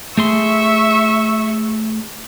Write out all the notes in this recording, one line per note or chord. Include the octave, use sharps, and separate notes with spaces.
A3 G#4 E5 C6 C#6